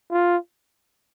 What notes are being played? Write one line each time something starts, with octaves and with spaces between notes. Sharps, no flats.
F4